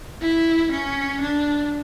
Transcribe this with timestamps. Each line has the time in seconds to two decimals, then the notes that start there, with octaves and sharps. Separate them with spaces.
0.22 E4
0.71 C#4
1.21 D4